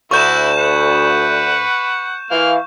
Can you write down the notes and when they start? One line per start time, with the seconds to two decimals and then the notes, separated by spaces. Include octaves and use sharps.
0.11 D2 E4 F#4 C#6 G6 E7
0.58 B4 F#5
2.31 E3 A#3 F5 F6